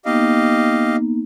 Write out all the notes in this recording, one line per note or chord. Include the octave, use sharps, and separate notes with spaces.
A#3 B3 D#4 G4 D#5 F5